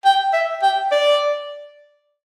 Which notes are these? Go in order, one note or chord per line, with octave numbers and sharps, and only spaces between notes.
G5
E5
G5
D5